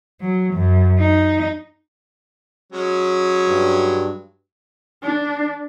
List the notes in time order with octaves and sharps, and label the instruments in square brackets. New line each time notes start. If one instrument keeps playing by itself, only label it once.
[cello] F#3
F#2
D#4
[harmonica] F#3 G#3 C#4
[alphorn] G2
[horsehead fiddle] D4